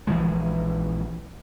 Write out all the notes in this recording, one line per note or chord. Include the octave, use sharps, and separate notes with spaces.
A#1 E3 F3 G#3